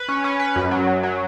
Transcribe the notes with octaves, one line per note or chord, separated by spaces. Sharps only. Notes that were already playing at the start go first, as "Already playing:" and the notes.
Already playing: B4
C#4
C#4
B4
F#2
F#3
F#3
F#3